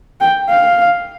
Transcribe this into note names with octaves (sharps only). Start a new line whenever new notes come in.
G5
F5